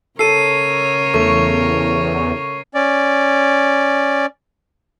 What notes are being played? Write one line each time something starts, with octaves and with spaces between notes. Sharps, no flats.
C#3 A4 A#4 C#5 C7 D#7
E2 A3 C#6
C#4 D5